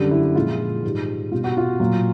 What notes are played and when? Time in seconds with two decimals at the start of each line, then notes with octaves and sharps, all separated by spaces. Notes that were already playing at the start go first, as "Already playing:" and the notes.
Already playing: F#2 D3 G3
0.11 E4
0.25 E4
0.35 A#2 F3 G#3 F4
0.83 G#2 D#3 G3
1.32 B2 G3 F4
1.44 F#4
1.57 F4
1.80 A#2 F#3